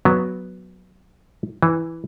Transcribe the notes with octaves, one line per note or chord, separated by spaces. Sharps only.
F#3 B3
E3